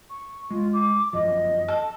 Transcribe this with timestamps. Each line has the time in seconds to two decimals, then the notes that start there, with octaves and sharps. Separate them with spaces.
0.10 C#6
0.51 G#3 F4
0.73 D6
1.13 G1 F#2 F3 D#5
1.68 A4